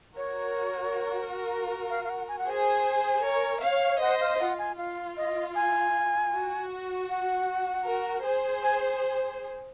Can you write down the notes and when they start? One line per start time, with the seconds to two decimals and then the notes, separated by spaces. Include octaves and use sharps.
0.17 F#4 A#4 C#5
1.90 F5
2.04 F5
2.10 F#5
2.28 G#5
2.39 F#5
2.47 G#4 C5 G#5
3.24 A#4 C#5
3.63 C#5 F5
4.01 C5 D#5 F#5
4.21 F5
4.40 F4 F#5
4.59 G#5
4.78 F4 F5
5.17 D#5
5.55 G#5
6.32 F#4
7.09 F#5
7.86 F#4 A#4
8.24 G#4 C5
8.63 G#5